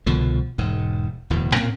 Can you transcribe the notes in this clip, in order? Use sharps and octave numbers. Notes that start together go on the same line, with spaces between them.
C2 B2 D3 F3
E1 G#2
D1 E2 B2
A2 A#3 C4 C#4